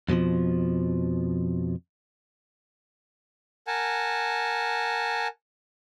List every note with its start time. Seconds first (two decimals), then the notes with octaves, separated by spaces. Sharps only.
0.09 F2 B2 E3 F3
3.67 A#4 F#5 G#5 A5